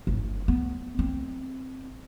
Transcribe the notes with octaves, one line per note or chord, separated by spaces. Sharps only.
G1
B3
C4